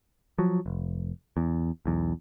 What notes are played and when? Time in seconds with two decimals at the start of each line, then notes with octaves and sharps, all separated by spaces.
0.38 F3 F#3
0.66 F1
1.37 E2
1.86 B1 E2